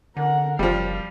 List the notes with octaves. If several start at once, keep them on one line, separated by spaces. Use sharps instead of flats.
D3 A#4 F#5
F#1 F3 G3 F5